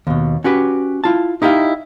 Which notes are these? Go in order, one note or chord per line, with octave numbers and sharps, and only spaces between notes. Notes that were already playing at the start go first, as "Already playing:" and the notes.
D#2 B2
C#4 F#4 G4 B4
E4 F4 A5
D#4 E4 G4 D#5 F5